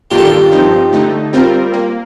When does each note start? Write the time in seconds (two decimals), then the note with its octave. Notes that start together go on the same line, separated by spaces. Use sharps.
0.11 G2 D#3 A#3 D4 F4 G4
0.18 A4
0.26 G4
0.52 G2 F3 C4 D#4
0.92 D3 A3 D#4
1.33 G3 C4 F4 A#4
1.73 A#3